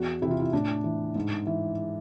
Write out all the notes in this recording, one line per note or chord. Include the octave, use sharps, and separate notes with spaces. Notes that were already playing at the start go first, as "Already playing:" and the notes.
Already playing: E2 F#4
C3 E3 E4
F4
E4
A2 D4
E3
G#2
E3